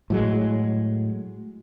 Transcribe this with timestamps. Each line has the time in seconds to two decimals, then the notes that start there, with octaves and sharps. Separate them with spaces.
0.10 A2 F#3 G#3